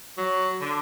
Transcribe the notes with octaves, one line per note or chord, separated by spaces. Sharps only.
F#3
D3